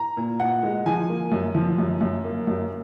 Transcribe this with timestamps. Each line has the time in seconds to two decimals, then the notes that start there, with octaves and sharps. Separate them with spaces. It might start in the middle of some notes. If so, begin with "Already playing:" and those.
Already playing: A#5
0.17 A#2
0.40 A#2 F#5
0.63 G#3
0.86 F3 G#5
1.09 A#3
1.32 F#2
1.55 F3
1.78 F#2
2.01 F#2
2.24 A#3
2.47 F#2